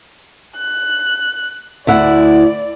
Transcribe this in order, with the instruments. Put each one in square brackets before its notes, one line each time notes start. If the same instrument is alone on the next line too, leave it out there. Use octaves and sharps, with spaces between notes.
[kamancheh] F#6
[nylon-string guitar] D2 E4 F#5 [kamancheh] D5